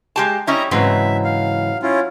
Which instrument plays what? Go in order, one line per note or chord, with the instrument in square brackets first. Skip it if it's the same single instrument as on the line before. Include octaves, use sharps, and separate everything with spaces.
[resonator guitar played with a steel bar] G#3 G4 A5
[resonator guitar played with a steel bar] G3 C#4 E4 [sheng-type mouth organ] D#5 A#5
[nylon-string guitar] G#2 C#3 E3 [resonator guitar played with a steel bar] F#3 C4 [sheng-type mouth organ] E5
[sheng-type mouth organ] F5
C#4 E4 F4